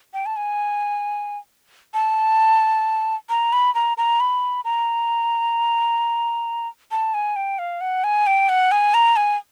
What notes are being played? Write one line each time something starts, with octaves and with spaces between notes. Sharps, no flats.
G5
A5
G#5
A5
A#5
B5
A#5
A#5
B5
A#5
A5
G#5
G5
F5
F#5
G#5
G5
F#5
G#5
A#5
G#5